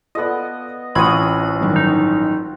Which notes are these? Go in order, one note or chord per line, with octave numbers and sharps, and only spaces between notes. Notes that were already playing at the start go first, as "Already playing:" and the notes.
B3 F4 A4 D5 D#5
A1 C4 F4 F#4 B5 D#6 G#6 D#7
G2 D#3 F#3
D#4